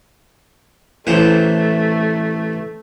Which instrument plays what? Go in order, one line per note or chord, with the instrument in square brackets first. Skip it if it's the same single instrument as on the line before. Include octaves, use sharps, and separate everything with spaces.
[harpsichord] A1 E3 C5 [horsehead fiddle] A3